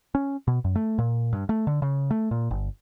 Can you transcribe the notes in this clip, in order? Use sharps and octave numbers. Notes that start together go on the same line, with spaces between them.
C#4
B2
F#2
A3
A#2
G2
A3
D3
C#3
A3
A#2
G1